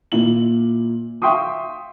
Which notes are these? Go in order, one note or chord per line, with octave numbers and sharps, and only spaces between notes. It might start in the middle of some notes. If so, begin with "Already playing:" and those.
A#2 E4 F#7
E5 F5 G5 C6 C#6 D#6